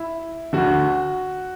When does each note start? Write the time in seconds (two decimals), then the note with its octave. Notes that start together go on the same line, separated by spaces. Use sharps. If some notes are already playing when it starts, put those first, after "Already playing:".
Already playing: E4
0.53 D2 D3 F#4